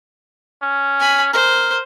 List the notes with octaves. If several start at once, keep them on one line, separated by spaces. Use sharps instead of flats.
C#4
G#5 B5
A#4 C5